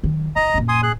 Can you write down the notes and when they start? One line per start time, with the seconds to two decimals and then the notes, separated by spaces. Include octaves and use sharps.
0.03 D#3 F#3
0.36 G#2 D#5 A#5
0.54 F#2 A#2
0.69 G#5 C6 D#6
0.83 G#4 F#6